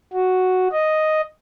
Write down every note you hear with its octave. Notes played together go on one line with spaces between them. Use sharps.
F#4
D#5